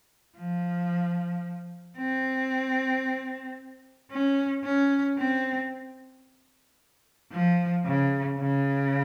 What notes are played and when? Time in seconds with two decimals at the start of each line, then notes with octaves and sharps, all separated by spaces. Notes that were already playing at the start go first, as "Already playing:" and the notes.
0.38 F3
1.97 C4
4.11 C#4
4.64 C#4
5.18 C4
7.32 F3
7.85 C#3
8.39 C#3